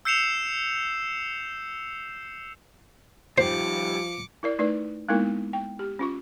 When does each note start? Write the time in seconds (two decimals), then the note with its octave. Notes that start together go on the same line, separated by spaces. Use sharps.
0.05 E6 G6 C7 C#7 E7 F7
3.38 D#3 F3 G3 C5 D6 C#7
4.43 E4 A#4 D5
4.59 A3 D#4 B4 D5
5.09 G#3 A#3 B3 D#4 E4 A#4
5.53 G5
5.79 G4
5.99 C#4 F4 C#6